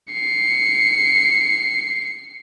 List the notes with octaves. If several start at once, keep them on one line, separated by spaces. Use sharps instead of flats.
C7 C#7